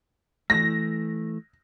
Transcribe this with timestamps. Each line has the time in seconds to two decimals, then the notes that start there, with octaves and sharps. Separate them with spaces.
0.50 E3 A3 A#6